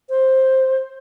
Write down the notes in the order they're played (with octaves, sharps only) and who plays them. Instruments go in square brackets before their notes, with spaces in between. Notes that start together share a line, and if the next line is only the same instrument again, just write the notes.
[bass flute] C5